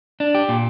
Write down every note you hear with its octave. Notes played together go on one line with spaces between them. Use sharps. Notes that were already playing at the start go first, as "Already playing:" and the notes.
D4
G4
A#2